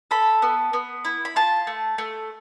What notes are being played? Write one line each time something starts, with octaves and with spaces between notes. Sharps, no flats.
A4 B5
B3
B3
E4
B5
F4 A5
A3
A3